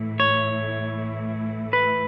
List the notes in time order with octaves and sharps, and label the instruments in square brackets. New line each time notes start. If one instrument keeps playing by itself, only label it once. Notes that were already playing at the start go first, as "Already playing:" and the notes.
Already playing: [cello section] A2 E3 A3 E4
[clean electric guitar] C#5
B4